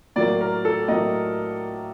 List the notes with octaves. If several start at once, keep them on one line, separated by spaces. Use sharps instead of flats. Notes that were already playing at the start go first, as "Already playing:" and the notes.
A2 F#3 A#3 D5
A#4
A4
A2 F#3 A#3 D#5